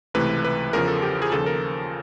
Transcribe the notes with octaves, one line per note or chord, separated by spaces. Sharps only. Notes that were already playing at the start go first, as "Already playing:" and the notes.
C#2 C3 E3 A3 B4
B4
E2 C#3 F3 A#4
A4
G4
G#4
D#2 C#3 F3 A4
A#4